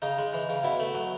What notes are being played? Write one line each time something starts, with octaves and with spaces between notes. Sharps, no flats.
C#3 D#4
G#3
E3
C#3
B2 E4
A3
F#3